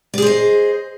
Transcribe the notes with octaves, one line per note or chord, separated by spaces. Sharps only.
G#4 C5 D5 D#5